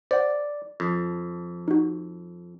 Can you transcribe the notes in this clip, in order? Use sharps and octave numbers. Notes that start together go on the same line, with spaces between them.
C5 D5 F#5
F2
D#4 F#4